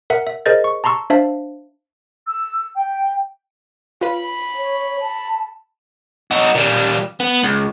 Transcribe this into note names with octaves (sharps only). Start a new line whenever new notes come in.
A#4 E5 F#5
E5
G#4 A#4 C5 D#5 G6 A6
C#6
A5 A#5 C6 C#6 E6
D4 C5 E5 F5 A5
E6
G5
F4 B4 B5
C#5
A5
D#4 F#4
A#2 G3
B3
C#2